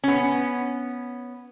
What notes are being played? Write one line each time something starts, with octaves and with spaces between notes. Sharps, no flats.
B3 C#4